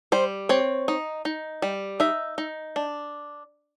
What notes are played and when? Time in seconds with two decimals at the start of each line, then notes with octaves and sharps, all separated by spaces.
0.12 G3 C5
0.49 C4 C#5
0.88 D#4
1.25 D#4
1.62 G3
2.00 D#4 E5
2.38 D#4
2.76 D4